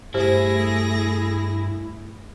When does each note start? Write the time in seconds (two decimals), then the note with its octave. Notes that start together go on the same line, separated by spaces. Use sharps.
0.14 G2 A3 E4 G4 G#4 C5 A#6